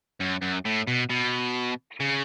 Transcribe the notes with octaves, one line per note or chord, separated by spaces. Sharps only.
F#2
F#2
A2
B2
B2
C#3